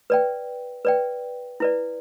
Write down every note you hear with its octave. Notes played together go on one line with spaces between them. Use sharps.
B4 D5 G5
B4 D5 G5
E4 B4 D5